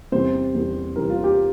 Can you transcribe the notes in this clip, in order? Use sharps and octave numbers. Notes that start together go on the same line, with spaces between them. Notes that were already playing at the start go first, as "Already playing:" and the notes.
E2 C3 G3 C4 C5
E2 C3 G3 C4
E2 C3 G3 C4 A#4
F4
G4